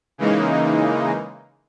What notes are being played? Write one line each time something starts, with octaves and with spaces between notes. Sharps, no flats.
C#3 E3 G#3 A#3 D#4